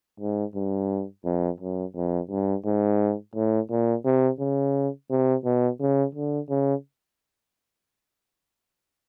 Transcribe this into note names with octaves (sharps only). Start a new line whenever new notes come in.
G#2
G2
F2
F#2
F2
G2
G#2
A2
A#2
C3
C#3
C3
B2
C#3
D3
C#3